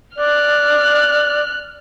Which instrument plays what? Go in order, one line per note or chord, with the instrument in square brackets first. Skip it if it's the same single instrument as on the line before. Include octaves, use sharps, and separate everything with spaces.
[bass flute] D5 [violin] F6 F#6